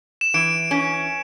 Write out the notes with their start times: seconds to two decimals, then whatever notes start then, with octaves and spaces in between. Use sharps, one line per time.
0.21 E7
0.34 E3 D7
0.71 C#4